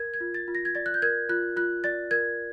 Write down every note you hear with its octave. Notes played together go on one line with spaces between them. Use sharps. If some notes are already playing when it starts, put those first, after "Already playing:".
Already playing: A#4 G#6
G#6
F4
A6
F4
A#6
G#6
D5 A6
F#6
G6
A#4 G#6
F4 F#6
F4 F#6
D5 A6
A#4 G#6